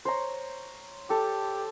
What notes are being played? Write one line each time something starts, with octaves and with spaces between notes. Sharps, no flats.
C5 C#5 A#5
G4 A4